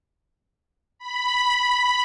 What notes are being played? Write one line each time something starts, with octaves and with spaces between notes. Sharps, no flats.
B5